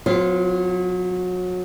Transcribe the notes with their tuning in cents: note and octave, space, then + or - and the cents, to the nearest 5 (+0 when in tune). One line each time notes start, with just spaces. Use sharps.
F#3 -30 C4 -45 F4 +0